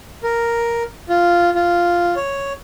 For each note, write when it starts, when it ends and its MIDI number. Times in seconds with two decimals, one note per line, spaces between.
0.23 0.83 70
1.09 1.50 65
1.55 2.14 65
2.16 2.53 73